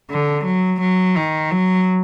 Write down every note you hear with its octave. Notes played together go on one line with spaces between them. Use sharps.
D3
F#3
F#3
D#3
F#3